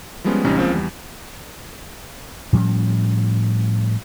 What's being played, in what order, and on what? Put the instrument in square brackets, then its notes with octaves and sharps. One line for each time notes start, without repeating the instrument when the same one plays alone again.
[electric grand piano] F3 G3 G#3 B3 C#4
A1 C3 G3 C#4 D#4
C#2 C#3 F3 A#3 C4
E2 G3
[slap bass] A2 F3 G3 C#4